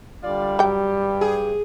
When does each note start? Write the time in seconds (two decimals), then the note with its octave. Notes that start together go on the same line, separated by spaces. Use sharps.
0.23 D3 G3 F4 D5
0.59 G2 F#3 G4 G5
1.21 G#4